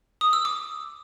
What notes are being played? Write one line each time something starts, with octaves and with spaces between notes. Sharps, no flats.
D#6
E6
D6